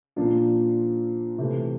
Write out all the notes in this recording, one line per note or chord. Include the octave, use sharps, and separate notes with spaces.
A#2 F3 A#3 D4 F4
C3 E3 A3